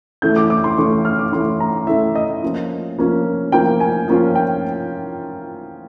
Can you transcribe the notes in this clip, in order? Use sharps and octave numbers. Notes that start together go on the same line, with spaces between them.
E3 A3 C#4 E4 G6
D6
D6
C6
E3 A3 C#4 E4 C#6
F6
D6
E3 A3 C#4 E4 C6
A#5
E3 A3 C#4 E4 E5
D#5
F3 A#3 C#4 F4
F3 A#3 C#4 F4
F3 A#3 C#4 F4 G5
G#5
F3 A#3 C#4 F4
G5